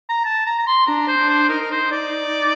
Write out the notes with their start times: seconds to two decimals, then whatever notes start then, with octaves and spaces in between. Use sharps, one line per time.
0.09 A#5
0.25 A5
0.46 A#5
0.59 A#5
0.67 C6
0.87 D4 A#5
1.08 C5
1.18 D4
1.29 C5
1.49 D#4 A#4
1.61 A#4
1.71 C5
1.92 D5